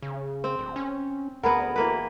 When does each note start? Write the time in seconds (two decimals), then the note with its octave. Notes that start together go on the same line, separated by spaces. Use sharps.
0.02 C#3
0.44 C4
0.59 D1
0.76 C#4
1.43 D2 B3 G#4 A#4 F#5 B5
1.76 E3 A#3 B4